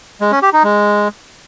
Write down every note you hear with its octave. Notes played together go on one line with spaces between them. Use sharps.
G#3
C#4
G4
D#4
G#3